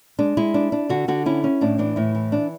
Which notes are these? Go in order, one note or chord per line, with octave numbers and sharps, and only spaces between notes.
G#3 D4
G#3 E4
D4
D4
D3 F#4
D3 F#4
C#4 E4
C#4
A2 D4
E3 D4
A2 E4
E3
D4